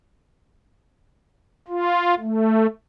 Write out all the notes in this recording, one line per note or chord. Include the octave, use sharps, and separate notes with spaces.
F4
A3